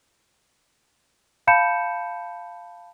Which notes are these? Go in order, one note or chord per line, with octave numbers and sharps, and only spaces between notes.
F5 A5 B5 G6 C#7 E7